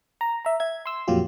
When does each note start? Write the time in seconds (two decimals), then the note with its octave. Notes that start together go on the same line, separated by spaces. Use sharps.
0.21 A#5
0.45 E5 A#5
0.60 E5 G#6
0.86 C6 E6
1.08 F2 A#2 F#3 F4 G4